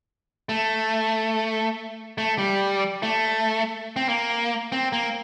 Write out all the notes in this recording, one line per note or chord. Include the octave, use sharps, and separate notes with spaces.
A3
A3
G3
A3
C4
A#3
C4
A#3